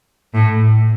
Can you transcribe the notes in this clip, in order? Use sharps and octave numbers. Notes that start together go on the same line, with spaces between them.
A2